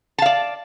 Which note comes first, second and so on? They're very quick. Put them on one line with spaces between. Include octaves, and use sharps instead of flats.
A5 F5 D5